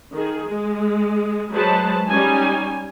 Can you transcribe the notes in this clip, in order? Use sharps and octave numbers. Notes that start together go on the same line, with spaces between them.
D#3 G#4
G#3
F#3 G#3 B4 C5 A5
G3 C#4 D#4 G#5